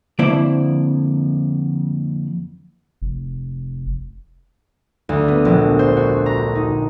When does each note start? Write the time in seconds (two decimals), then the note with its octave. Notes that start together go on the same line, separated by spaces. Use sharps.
0.19 F2 D3 A#3 E4 C5 D5
3.02 F1
5.09 D2
5.28 B3
5.45 A#1
5.79 C5
5.97 F#4
6.26 A#5
6.55 D#4